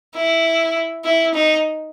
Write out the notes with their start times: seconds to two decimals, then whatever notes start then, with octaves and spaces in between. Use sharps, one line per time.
0.16 E4
1.05 E4
1.34 D#4